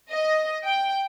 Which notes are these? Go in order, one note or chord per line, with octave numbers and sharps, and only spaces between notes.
D#5
G5